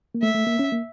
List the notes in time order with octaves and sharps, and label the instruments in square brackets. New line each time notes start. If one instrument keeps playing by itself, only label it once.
[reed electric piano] A#3
[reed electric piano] A3 [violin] E5
[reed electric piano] A3
A#3
C#4
A#3